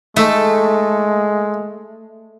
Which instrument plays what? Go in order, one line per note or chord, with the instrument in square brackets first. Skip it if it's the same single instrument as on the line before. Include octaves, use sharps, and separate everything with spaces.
[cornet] G#3 [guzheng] A3 [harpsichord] D#4 A4